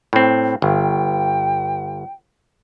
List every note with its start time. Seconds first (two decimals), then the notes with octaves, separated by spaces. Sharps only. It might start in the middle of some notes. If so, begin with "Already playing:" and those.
0.13 A2 C4
0.62 G1 G5